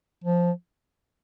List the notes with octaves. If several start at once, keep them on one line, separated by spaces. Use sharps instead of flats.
F3